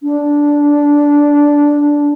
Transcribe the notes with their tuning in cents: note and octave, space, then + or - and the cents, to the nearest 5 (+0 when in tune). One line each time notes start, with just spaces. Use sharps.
D4 -10